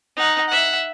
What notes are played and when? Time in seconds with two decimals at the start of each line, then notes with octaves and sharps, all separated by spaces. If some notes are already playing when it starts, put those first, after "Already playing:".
0.17 D#4 F#5
0.49 E5 F#5